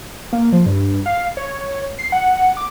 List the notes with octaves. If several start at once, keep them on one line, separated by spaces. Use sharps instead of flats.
A#3
F3
G2
F5
C#5
C7
F#5
D6